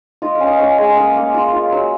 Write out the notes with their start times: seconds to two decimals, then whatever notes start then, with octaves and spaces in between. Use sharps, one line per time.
0.22 F4 D#5
0.35 F5
0.40 C#4
0.47 D#5
0.59 C#4 C#5
0.78 G#3
0.87 F5
0.97 A#3 D#5
1.16 A#3
1.34 F4
1.53 F4
1.72 F#3